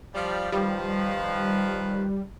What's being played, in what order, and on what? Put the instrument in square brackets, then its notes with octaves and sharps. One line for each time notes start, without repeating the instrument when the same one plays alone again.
[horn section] F3 G3
[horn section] D#3 F3 B4 [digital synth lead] G3